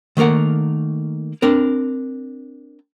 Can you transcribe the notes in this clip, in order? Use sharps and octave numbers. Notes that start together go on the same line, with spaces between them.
D#3 A3 A#3 A#4 F#5
C4 D4 A#4